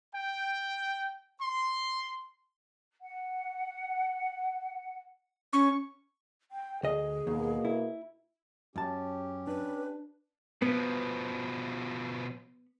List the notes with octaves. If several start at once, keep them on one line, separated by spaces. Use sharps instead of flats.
G5
C6
F#5
C#4 C#6
G5
D2 G#4 D#5
D#2 B2 A#3
E4
F#2 C#4 G4 A5
D4 B4
B2 F3 B3